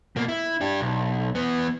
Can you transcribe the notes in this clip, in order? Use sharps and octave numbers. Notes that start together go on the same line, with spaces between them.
B2 A#3
E4
D4 G4
B1
E3 B3